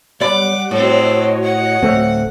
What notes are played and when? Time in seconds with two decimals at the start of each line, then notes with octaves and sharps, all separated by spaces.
0.20 B1 G3 D5 F#5 B5 D6
0.71 A2 C4 F#4 A4 C#5 D#5
1.43 F#5
1.83 D1 A3 C4